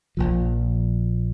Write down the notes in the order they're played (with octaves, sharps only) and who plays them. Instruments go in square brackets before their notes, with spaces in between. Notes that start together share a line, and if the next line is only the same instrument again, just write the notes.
[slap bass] A#1 A#2 F3